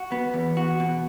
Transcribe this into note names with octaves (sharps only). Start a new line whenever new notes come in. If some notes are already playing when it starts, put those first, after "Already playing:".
Already playing: F#4
B3
E2
F#4
B2